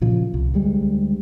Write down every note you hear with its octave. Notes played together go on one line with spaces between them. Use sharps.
A#2 C#3 F3
C2
D2 G3 G#3